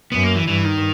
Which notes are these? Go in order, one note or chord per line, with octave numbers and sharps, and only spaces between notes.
F#2 B3
A#3
E3
G2 E3
D#3